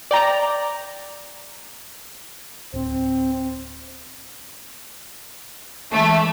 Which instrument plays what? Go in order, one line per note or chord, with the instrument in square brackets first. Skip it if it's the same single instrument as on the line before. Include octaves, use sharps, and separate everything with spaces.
[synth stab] D5 G5 A#5
[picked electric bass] D1 [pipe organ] C4
[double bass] E3 G#3 [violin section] A3